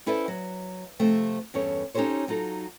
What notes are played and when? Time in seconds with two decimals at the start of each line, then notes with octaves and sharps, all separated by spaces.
0.06 C#4 E4 A4 B4 C5 D5
0.28 F#3
0.99 C3 F3 A3 C4
1.54 E2 G2 C#4 A4 C#5
1.94 C#4 D#4 G4 A4 C5 C#5
2.28 F#3 D#4 F4 A4